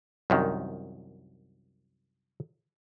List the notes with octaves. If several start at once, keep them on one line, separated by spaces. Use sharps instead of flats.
C2 F#2 D#3